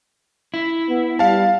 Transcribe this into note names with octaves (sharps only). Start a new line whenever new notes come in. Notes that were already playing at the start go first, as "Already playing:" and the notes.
E4
B3
G3 F5 A5